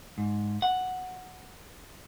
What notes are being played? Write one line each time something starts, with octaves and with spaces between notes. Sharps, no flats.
G#2
F#5